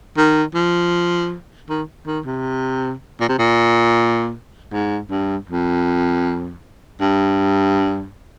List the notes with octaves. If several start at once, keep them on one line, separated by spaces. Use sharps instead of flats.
D#3
F3
D#3
D#3
C3
A#2
C3
A#2
G#2
G2
F2
G2